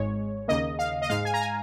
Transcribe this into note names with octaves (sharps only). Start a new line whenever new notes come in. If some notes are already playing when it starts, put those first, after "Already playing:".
Already playing: G#1 G#2 G#3 C#5
D#2 C#3 A#3 D#5
F5
D#5
G#2 G#3 F5
G#5
A#5
G#5